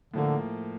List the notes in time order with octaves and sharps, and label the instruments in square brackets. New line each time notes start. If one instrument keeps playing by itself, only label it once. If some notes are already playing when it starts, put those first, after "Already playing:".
[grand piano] A2 F3 A#3 [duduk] D3